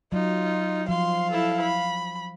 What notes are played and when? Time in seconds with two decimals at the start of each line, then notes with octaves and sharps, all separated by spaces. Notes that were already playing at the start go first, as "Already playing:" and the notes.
0.12 F#3 D#4 F4
0.89 F3 F5 C6
1.31 E4 A4
1.62 B5